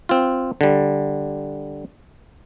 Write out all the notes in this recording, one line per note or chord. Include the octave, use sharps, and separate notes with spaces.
C4 F4
D3 G3